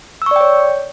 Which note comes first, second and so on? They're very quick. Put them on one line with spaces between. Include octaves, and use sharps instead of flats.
E6 C#6 D5 G5 C#5